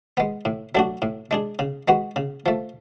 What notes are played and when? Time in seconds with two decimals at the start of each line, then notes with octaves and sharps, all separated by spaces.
0.17 G#3 B3
0.45 A2
0.75 F#3 A3 D4 F#4
1.02 A2
1.31 G#3 D4 G#4
1.59 C#3
1.88 G#3 B3 F#4
2.16 C#3
2.46 F3 A3